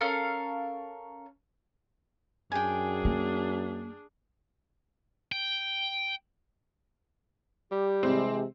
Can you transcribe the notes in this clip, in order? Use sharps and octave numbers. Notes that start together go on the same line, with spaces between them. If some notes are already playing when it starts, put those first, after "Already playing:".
C#4 A4 A#4 F5
F#2 D4 G#4 G5 G#5
A#3
G5
G3 G4
C3 E3 G#3 C4